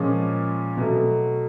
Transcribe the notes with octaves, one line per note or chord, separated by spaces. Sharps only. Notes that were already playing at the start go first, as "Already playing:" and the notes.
Already playing: A#2 F3 G#3 C#4
B2 F#3 A3